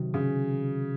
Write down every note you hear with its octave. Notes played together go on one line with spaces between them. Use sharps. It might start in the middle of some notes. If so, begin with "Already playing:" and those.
Already playing: C3 D#3 F#3
C#3